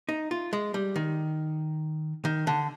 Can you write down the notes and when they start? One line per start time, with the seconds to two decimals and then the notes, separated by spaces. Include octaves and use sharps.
0.09 D#4
0.31 F4
0.53 G#3
0.74 G3
0.96 D#3
2.25 D#3
2.47 D3